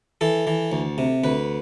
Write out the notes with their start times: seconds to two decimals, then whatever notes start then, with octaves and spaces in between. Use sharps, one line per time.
0.21 E3 A4
0.47 E3
0.72 D2
0.98 C3
1.24 D2 B4